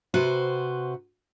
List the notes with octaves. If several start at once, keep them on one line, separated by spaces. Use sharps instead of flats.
C3 F#4 B4 C5